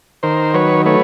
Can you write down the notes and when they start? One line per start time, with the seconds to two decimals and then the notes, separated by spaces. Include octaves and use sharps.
0.23 D#3 A#4 C5
0.54 F#3 B4 C#5
0.86 A3 B4 C#5